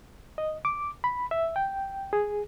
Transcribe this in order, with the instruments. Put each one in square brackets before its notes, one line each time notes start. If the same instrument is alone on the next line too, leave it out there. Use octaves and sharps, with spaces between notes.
[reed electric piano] D#5
D6
B5
E5
G5
G#4